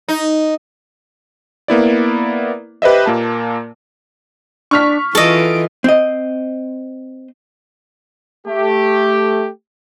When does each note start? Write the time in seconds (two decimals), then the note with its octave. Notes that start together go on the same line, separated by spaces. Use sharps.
0.08 D#4
1.68 A#3 B3 E4 D5
2.82 G4 B4 C5 D#5 E5
3.06 A#2 A#3 A5
4.71 D4 C#6 F6 B6
5.15 E3 F4 A4 D#5 D7
5.84 C4 D#5
8.47 A3 G4